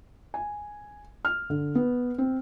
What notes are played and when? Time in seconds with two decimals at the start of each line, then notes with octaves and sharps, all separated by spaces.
0.34 G#5
1.25 F6
1.50 D3
1.75 B3
2.18 C4